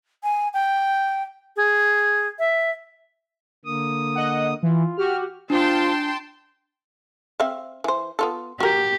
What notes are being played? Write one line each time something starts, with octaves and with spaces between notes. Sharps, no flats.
G#5
G5
G#4
E5
D3 A#3 D#6
D#5 F#5
E3 F4
F#4 G4 F6
D4 F4 C5 G5 A5 C6
C4 E5 F5
E3 C5
B3 F4 A4
F#4 G4 A#4